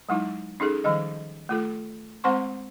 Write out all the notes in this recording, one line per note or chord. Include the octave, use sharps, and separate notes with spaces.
F#3 G#3 D#4 E4
C#4 D#4 G#4 A4
D#3 F3 G3 D#5
A3 F4 A4
G#3 C4 C5 F#5 C6 C#6